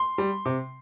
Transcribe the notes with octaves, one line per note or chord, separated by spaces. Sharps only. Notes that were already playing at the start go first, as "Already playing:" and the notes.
Already playing: C6
G3
C3